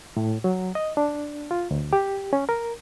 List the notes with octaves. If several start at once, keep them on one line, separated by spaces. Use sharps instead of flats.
A2
F#3
D#5
D4
F4
D2
G4
C#4
A#4